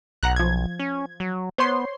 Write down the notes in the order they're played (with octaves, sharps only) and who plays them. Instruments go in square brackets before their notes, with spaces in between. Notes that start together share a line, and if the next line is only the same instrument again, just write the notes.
[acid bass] B1 [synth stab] F#5 A#5 F#6
[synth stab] F3 G#6
[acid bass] C#4
F#3
[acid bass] B3 [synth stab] C5 C#5 C6